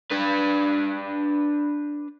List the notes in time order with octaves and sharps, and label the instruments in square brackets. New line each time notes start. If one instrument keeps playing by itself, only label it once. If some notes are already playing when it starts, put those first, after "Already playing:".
[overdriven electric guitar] D4 B4